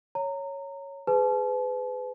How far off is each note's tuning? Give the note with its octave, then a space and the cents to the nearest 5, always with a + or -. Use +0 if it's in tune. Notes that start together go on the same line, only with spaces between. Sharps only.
C#5 +0 A#5 -20
G#4 +0 B4 +30 A5 -40